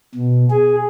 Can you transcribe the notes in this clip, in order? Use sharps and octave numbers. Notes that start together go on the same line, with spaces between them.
B2
G#4